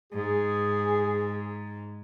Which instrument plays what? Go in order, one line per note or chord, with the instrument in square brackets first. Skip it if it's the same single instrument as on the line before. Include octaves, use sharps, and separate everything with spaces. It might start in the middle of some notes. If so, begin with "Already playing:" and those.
[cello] G#2 [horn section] G#4